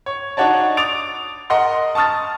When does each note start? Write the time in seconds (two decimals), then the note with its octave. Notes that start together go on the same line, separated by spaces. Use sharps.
0.06 C#5
0.37 D4 D#4 F#4 C#5 D5 A5
0.77 D6 D#6 A6 D7 F7
1.50 A#4 D#5 F#5 C6
1.95 A5 C#6 D#6 F6 A6